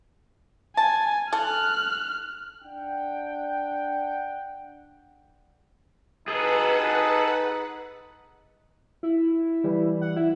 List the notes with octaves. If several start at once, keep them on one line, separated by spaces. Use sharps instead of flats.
G#5 A5
A4 F6 F#6
D4 F#5 G5
D#4 G#4 A4 B4 F#5
E4
E3 G3
F#5
E4